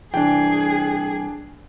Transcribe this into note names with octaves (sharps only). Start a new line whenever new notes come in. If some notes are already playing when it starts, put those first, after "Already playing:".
C2 E3 D4 G#4 G5